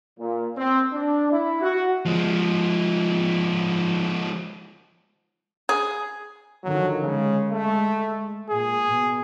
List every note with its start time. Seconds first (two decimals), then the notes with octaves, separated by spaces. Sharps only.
0.19 A#2
0.57 C4
0.93 D4
1.32 E4
1.61 F#4
2.05 F3 G#3
5.69 G#4
6.64 D3 D#3 F3 F#3
7.02 C#3 G#3
7.50 A3
8.50 A#2 G#4
8.88 B2